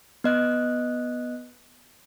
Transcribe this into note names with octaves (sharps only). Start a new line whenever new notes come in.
B3 D#5 F#6